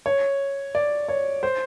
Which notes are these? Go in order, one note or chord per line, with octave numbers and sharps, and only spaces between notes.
C#5
D5
C#5
C5